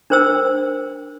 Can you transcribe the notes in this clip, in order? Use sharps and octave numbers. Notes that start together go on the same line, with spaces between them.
D4 A#4 C5 G5 E6